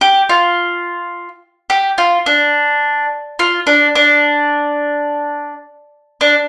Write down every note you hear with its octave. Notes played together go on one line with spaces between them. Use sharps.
G4
F4
G4
F4
D4
F4
D4
D4
D4